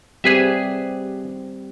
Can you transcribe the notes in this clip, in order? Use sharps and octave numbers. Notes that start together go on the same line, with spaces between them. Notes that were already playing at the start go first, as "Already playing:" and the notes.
G3 C4 G4 G#4 B4 E5